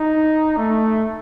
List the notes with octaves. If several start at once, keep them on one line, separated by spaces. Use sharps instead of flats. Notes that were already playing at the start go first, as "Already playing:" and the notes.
Already playing: D#4
A3